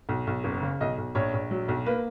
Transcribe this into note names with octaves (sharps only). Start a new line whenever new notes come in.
B1
B1
F#1
C#3
B1 D#5
B1
A#1 C#5
A#1
F#3
B1
A#3 B4